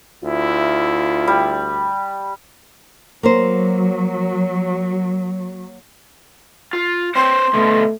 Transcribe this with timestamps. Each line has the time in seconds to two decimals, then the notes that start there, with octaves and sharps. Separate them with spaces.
0.24 D2 E4 F4
1.28 G3
3.23 F#3 A#3 A#4 C5
6.73 F4
7.15 C4 C5 C#5 C6
7.54 B2 D3 A3